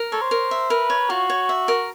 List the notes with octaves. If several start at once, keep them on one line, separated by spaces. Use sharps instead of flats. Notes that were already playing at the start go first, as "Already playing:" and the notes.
Already playing: A#4
A4 C#5
C5
A#4
E5
A#4 B4
C#5
F4 F#4
C#5
E5
A#4